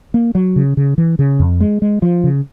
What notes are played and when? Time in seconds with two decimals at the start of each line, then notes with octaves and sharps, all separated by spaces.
0.14 A#3
0.35 F#3
0.56 C#3
0.77 C#3
0.98 E3
1.19 C#3
1.40 F2
1.60 G#3
1.82 G#3
2.02 F3
2.24 C#3